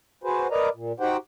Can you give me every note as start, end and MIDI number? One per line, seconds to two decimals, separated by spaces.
0.24 0.48 66
0.24 0.48 68
0.24 0.48 71
0.24 0.48 72
0.51 0.69 70
0.51 0.69 71
0.51 0.69 74
0.51 0.69 75
0.51 0.69 82
0.74 0.92 46
1.00 1.17 63
1.00 1.17 66
1.00 1.17 67
1.00 1.17 72
1.00 1.17 78
1.00 1.17 79